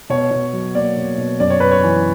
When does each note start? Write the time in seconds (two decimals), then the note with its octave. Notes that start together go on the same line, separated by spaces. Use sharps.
0.10 B2 C#5
0.31 B2
0.53 F#3
0.74 A#3 D5
0.97 B2
1.18 B2
1.40 F#2 D5
1.50 C#5
1.60 F#2 B4
1.71 C#5
1.83 E3